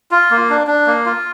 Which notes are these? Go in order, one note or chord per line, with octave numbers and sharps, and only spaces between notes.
F4
A#3
D4
D4
A#3
F4